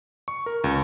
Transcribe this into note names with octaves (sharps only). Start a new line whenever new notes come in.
C#6
A#4
C#2